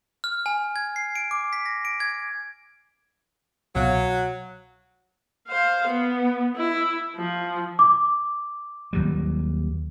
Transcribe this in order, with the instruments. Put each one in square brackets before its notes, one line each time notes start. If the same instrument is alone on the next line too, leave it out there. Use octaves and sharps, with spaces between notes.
[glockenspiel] F6
G#5
G#6
C7
D7
D6
B6
A#6
D7
G#6
[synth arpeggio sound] C2 B2 F5 [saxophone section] F#3
[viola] C5 F5
B3
E4
F3
[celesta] D6
[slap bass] D#2 F#3 G3